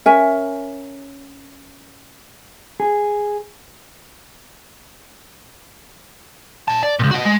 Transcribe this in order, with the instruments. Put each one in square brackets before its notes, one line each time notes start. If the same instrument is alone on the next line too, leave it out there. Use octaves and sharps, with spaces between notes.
[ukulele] C#4 A#4 E5 G#5
[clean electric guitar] G#4
[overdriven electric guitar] A#2 A5
D5
C#2 A#2
F#4 D#5
G#3